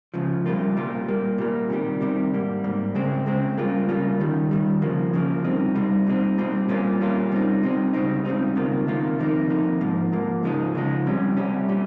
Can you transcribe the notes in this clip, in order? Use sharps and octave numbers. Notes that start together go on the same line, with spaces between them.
C#2 C#3 F3
C2 A#2 G3 A#3 F4
C2 A#2 G3 A#3 F4
A#2 G3 A#3
A#2 G3 A#3
C3 D#3 G3
C3 D#3 G3
G#2 G3 A#3
G#2 G3 A#3
C#2 C#3 G#3 C4
C#2 C#3 G#3 C4
C#3 G3 A#3 F4
C#3 G3 A#3 F4
D#2 D#3 G3
D#2 D#3 G3
C#3 F3 A#3
C#3 F3 A#3
C2 C3 G3 C4 D#4
C2 C3 G3 C4 D#4
A#2 G3 C4 D#4
A#2 G3 C4 D#4
A#2 G3 A#3 C#4 F4
A#2 G3 A#3 C#4 F4
C3 G3 C4 D#4
C3 G3 C4 D#4
C#2 C#3 G3 C4 D#4
C#2 C#3 G3 C4 D#4
C#2 C3 D#3 A#3 F4
C#2 C3 D#3 A#3 F4
F2 C3 D#3 A#3 D#4
F2 C3 D#3 A#3 D#4
G#2 F3 A#3
G#2 F3 A#3
C#2 C#3 F3 G#3 D#4
C#2 C#3 F3 G#3 D#4
C2 C3 G3 C#4
C2 C3 G3 C#4
A#2 G3 C#4